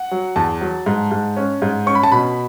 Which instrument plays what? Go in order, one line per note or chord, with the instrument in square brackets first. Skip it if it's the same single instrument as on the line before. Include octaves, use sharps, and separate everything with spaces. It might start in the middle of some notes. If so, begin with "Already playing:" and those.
Already playing: [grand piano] F#5
F#3
E2 A5
F#3
G#2
G#2
C#4
G#2
C#4 C#6
B5
A5
B2 B5